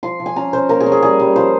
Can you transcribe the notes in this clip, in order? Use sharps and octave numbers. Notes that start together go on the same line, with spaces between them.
F3 C6
F3
G#5
C#4 A#5
C#4 C5
A#3 A#4
G#4
C#4
G#4
G3 G#4
G3
F3 C5